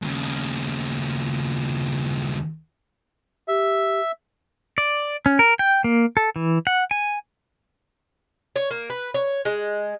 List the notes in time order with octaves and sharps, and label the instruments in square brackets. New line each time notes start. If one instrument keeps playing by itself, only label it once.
[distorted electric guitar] D#2 C#3
[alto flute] G4 [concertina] E5
[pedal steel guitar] D5
C#4
A#4
G5
A#3
A4
E3
F#5
G#5
[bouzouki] C#5
A#3
B4
C#5
G#3